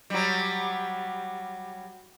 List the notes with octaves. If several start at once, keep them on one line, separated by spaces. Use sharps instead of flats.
F#3 G3